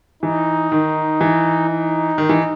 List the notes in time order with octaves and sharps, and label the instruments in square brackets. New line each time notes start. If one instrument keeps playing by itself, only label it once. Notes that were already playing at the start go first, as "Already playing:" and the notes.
[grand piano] E3 [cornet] D#4
[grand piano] D#3
E3
[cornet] D#4
[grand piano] D#3
E3